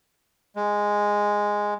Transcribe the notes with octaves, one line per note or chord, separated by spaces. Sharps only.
G#3